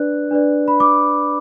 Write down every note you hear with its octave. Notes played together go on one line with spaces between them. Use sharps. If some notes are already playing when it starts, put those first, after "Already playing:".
Already playing: D4 B4 D5 F#6
D4 B4 D5
B5
D6